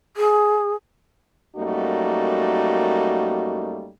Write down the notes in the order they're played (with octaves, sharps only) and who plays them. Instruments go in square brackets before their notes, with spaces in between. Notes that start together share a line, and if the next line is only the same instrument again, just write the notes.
[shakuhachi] G#4
[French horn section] F#2 G3 A3 A#3 D#4 F#4